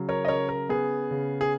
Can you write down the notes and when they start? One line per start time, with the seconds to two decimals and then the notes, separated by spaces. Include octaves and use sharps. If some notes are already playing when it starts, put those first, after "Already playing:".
Already playing: C#3 F#3
0.09 A#4 C#5
0.25 D#5
0.28 C#3 A#4 C#5
0.49 A#4
0.69 B3 G#4
1.11 C#3
1.41 G#4